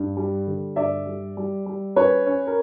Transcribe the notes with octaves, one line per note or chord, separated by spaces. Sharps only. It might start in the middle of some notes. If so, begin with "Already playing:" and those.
Already playing: G2
G3
D3
G2 D5 E5
G3
G3
G3
C#4 B4 C#5
C#4
A#4